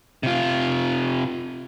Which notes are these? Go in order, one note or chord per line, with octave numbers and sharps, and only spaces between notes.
C3 F4